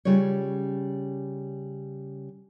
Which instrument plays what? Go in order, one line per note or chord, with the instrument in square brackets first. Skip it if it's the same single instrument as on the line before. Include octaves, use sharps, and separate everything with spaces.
[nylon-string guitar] C#3 G3 C#4 F4 C#5